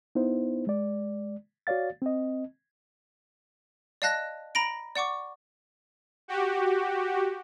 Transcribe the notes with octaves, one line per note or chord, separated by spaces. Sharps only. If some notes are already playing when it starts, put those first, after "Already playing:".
B3 D#4 E4 C5
G#3 D5
F#4 C#5 D5 F5 A6
C4 D#5
D5 D#5 F5 A5 F#6 A#6
A#5 B5 A#6 D7
D5 F#5 C#6 D6
F#4 G4